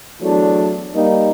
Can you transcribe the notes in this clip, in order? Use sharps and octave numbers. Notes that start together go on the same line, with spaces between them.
E2 F#3 A3 D4
G3 A#3 D#4